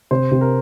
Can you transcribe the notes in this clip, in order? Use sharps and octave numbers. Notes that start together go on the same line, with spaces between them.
C3 C5
C3
A#4